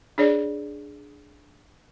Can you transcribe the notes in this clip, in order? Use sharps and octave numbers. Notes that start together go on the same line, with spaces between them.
D4 G#4 C#5 D5